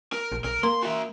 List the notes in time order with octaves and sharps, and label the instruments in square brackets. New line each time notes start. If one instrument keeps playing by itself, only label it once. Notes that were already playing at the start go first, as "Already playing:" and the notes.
[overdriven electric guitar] A#4
[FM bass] A#1
[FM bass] B1 [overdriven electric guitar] A#4
[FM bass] A#3 [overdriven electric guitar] C6
[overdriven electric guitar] F#4 E5